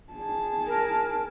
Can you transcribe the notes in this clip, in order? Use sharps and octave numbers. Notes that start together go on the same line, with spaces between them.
G#4 A5
A#4